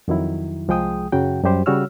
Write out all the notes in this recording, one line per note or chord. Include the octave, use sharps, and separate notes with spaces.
F2 D#3 F#3 E4
C2 F3 G#3 G#4 G5 D#6
F#2 C#3 F#3 F#4 G5
F#2 G3 G4 C5
C#3 G3 F#4 C#5 E6 F6